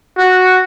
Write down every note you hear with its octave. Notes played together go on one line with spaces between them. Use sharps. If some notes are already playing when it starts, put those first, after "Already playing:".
F#4